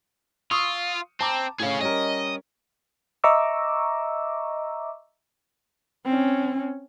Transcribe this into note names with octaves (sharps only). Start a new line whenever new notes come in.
F4 C#6 D#6 E6
C4 A5 A#5 D6
A2 C#4 G#4 F5
G3 C#4 A#4 D#5
D#5 E5 A#5 C#6 D6 E6
C4 C#4